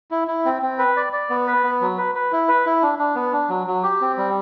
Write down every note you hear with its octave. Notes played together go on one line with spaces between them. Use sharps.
E4
E4
C4
C4
B4
D5
D5
B3
B4
B3
F#3
B4
B4
E4
B4
E4
D4
D4
B3
D4
F#3
F#3
G4
C4
G3